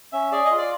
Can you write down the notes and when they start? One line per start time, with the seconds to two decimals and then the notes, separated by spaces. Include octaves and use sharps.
0.13 C#4 E5
0.32 G#4 D5
0.45 D#5
0.51 F4
0.58 D5